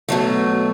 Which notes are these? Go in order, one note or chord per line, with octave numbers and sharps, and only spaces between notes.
B2 F#3 A3